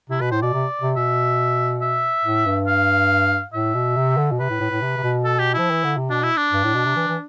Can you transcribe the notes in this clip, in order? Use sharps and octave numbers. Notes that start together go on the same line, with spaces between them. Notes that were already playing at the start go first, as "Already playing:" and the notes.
C3 E4
B2 B4
A2 C5
B2 D5
C3
C3
B2 E5
E5
A2
G2
F5
A2 E5
B2
C3
D3
B2
C3 B4
A2
A2
A2
C3
C3
B2
A4
G4
F3 E4
E3
D3
C3
B2 D4
E4
D4
G2
A2
B2
C3
E3
E3